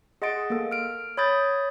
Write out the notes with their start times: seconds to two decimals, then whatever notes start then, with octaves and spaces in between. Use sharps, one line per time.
0.22 G#4 D#5 F#5 C6 A6 D7
0.50 A#3 A4
0.72 F6 D7
1.17 C#5 B5 D#6 G6 A6